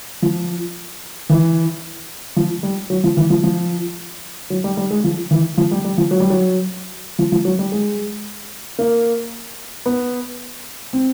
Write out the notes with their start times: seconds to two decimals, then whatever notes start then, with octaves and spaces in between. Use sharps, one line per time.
0.22 F3
1.30 E3
2.36 F3
2.63 G3
2.90 F#3
3.04 F3
3.17 E3
3.30 F3
3.43 F3
4.50 F#3
4.64 G3
4.77 G3
4.91 G#3
5.04 F3
5.31 E3
5.58 F3
5.71 G3
5.85 G3
5.98 F3
6.11 F#3
6.20 G3
6.30 F#3
7.19 F3
7.32 F3
7.45 F#3
7.59 G3
7.72 G#3
8.79 A#3
9.86 B3
10.93 C4